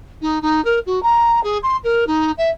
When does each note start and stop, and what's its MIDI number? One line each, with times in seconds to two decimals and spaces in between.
0.21 0.41 63
0.41 0.63 63
0.64 0.79 70
0.86 1.01 66
1.02 1.42 82
1.43 1.57 68
1.63 1.76 84
1.83 2.04 70
2.06 2.31 63
2.37 2.50 76